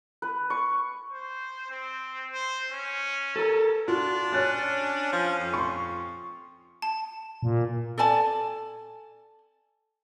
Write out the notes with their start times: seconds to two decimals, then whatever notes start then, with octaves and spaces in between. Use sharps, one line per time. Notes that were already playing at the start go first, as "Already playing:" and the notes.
0.22 B4
0.50 C#6
1.12 C5
1.70 C4
2.32 C5
2.72 C#4
3.36 A4 A#4
3.88 D4 F4 F#4
4.33 C#4 C#5 F#6 A6
5.12 F3
5.39 F2
5.53 C6 C#6
6.82 A5
7.43 A#2
7.98 A4 D5 G#5 A5